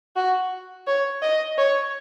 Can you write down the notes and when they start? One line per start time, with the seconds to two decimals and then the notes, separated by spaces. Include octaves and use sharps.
0.16 F#4
0.87 C#5
1.22 D#5
1.58 C#5